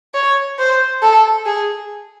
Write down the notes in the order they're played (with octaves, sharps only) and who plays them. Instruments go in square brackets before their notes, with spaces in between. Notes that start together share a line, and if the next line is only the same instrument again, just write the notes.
[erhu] C#5
C5
A4
G#4